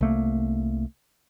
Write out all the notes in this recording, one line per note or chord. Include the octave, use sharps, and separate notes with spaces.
C2 A3 A#3